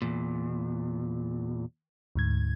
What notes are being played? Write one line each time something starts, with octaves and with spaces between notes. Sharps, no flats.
E2 A#2
D2 G#2 G#6